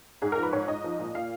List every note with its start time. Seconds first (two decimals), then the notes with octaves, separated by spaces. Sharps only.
0.22 G#2 G#4
0.32 A#4
0.37 F3
0.43 B4
0.53 G#2 C#5
0.68 G#2 D#5
0.84 F3
0.99 A#2
1.15 A#2 F5